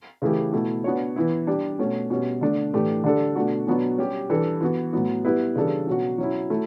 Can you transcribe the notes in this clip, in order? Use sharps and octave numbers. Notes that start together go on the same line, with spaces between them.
C#3 E3 A3 E4 G4
B2 A3 E4
B3 D4 F#4 C#5
E3 B3 E4
G3 D4 G4
B2 A3 C#4
B2 G3 C#4
D3 A3 D4
A2 E3 A3 D4 G4
D3 G3 D4 A4
B2 A3 D4 F#4
B2 F#3 B3 D4 F#4
G3 C#4 G4
E3 G3 D4 A4
E3 B3 F#4
A2 F#3 B3
G3 B3 E4 B4
C#3 E3 G3 D4 A4
B2 F#3 C#4 F#4
F#3 C#4 E4
F#3 A3 E4